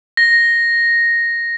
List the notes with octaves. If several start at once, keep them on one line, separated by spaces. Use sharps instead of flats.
A#6